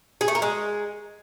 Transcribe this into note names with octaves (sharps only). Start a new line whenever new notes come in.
G#4
A3
A#4
G#3